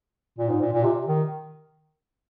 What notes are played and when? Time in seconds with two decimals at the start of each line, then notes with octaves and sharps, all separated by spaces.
0.38 A#2
0.50 G#2
0.61 A#2
0.73 A#2
0.84 C3
1.07 D#3